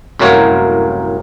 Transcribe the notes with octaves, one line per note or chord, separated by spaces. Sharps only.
C2 F#2 A2 A#3 C#5 F#5